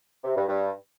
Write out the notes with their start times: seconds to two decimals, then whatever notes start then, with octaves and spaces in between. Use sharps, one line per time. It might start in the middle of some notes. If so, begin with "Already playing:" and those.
0.24 C3
0.36 G2
0.48 G2